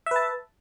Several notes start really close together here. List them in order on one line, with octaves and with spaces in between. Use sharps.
E5 B4 A5